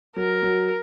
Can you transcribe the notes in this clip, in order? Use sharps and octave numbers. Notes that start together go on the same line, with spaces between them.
F#3 A#4
F#3